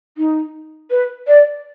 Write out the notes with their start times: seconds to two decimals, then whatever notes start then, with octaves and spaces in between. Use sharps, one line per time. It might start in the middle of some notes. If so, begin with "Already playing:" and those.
0.18 D#4
0.91 B4
1.27 D5